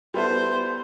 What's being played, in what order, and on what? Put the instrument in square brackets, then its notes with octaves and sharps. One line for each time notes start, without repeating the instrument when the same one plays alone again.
[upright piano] G3 B3 E4 A4 [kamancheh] C5